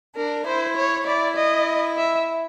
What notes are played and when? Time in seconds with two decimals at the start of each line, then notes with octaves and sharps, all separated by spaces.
0.16 D4 A#4
0.46 E4 C5
0.76 C#5
1.07 E4 D5
1.36 D#5
1.97 E5